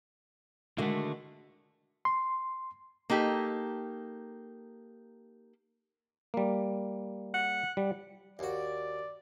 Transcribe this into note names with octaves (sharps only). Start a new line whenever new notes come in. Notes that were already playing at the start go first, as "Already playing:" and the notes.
D3 D#3 G#3 A3 F#4
C6
A#3 D#4 G4 A4
G3 A#3
F#5
G3
D#2 F#4 D5